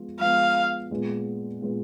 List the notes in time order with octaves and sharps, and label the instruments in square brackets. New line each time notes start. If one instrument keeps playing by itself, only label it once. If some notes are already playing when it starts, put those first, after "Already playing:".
Already playing: [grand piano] F3 G#3 B3 F4
[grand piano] F3 G#3 B3 F4 [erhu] F5
[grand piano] A#2 G#3 B3 F4
A#2 G#3 B3 F4